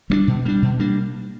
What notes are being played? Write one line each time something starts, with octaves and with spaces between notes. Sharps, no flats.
G3 A#3 D4
B2
G3 A#3 D4
B2
G3 A#3 D4